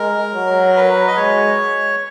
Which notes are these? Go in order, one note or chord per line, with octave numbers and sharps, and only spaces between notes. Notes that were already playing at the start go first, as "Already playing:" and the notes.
Already playing: G#3 A#4
F#3
B4
D#5
G#3 C#5